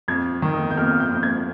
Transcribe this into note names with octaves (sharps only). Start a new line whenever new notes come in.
F2 G#6
D#3
D#6
G6
F2 F6
G6
F2
G#6